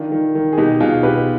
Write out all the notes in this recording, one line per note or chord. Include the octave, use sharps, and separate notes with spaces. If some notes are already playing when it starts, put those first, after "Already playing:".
Already playing: D#3 D4 F4
D#3
D#3
G#4
B2 D#4 G4
B2 F4 G#4
B2 G4 B4